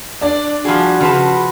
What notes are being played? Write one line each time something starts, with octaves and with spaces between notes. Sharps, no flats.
D4 D5
F3 G3 F#4 G#4
C#3 F3 B4 A5